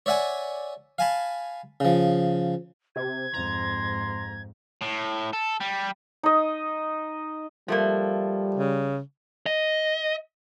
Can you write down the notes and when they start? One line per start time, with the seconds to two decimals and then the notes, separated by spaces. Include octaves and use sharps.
0.06 C#5 D5 E5 F#5 G#5
0.98 F5 G#5 A5 B5
1.80 C#3 F3
2.96 C3 G#6
3.33 F2 G#2 A#5 C6
4.82 A2
5.33 A4
5.60 G3
6.23 D#4 D#5
7.68 F3 G3 A3 A#3
8.55 C#3
9.46 D#5